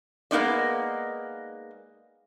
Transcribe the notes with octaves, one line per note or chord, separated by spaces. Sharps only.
G#3 A#3 B3 D#4 D5